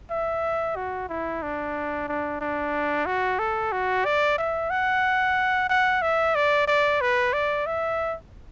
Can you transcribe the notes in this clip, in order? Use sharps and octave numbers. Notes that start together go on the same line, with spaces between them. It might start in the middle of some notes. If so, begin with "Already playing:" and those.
E5
F#4
E4
D4
D4
D4
F#4
A4
F#4
D5
E5
F#5
F#5
E5
D5
D5
B4
D5
E5